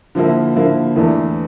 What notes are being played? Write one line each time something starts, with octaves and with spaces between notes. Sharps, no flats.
D3 F3 A#3 E4
D3 F3 A#3 E4
E2 E3 A3 D4